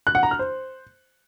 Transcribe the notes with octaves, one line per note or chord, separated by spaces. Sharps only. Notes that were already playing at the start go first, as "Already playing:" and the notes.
F#6
F#5
A#5
F6
C5